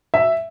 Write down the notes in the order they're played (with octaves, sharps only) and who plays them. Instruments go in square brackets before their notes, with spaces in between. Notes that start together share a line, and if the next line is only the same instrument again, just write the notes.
[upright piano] E5